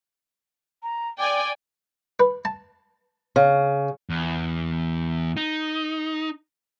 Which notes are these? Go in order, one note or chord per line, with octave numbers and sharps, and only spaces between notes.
A#5
D5 G5 G#5 D6
B4
A5
C#3
E2
D#4